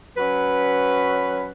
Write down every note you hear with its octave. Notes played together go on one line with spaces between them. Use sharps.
F#3 C#4 B4